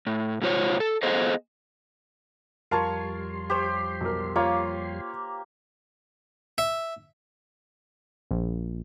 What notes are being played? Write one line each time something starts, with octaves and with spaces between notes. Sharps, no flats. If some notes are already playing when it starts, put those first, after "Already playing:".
A2
G#2 C3 F4 C5 C#5
A4
B3 G#4 A4 C5 D#5 F5
F2 G3 F4 A#4 C#5 A5 C6
G4 C5 C#5
B1 A#4
A#3 F4 C#5
E5
A#1